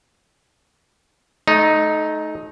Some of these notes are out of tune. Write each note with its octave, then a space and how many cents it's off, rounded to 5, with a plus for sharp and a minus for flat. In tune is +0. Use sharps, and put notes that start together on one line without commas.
A3 -30 D#4 +0